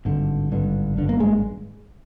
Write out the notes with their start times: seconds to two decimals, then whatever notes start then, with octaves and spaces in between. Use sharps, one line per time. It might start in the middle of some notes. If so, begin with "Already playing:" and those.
0.05 G#1 G2 D3
0.51 G#1 G2 D3
0.97 G#1 G2 D3
1.09 A#3
1.20 G#3